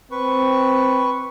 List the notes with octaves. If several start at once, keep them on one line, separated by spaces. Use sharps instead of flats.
C4 B4 C#6